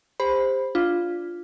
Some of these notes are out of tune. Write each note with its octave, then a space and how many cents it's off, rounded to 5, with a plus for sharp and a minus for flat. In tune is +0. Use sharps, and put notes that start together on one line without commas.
G4 +35 C5 +0 B5 +0
D4 +0 F4 +0